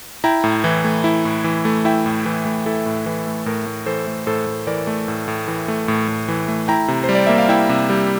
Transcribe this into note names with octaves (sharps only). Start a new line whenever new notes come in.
E4 G5 A#5
A2
E3
A3
E4
A2
E3
A3
E4 E5 G5
A2
E3
A3
E4 A4
A2
E3
A3
A2 A#4
A2
E3 A4 C5
A3
A2 A4 C5
A2
E3 A#4 D5
A3
A2
A2
E3
A3
A2
A2
E3
A3
E4 G5 A#5
C3
G3 C5
D5
A#3 E5
F5
E4 E5 G5
C3
G3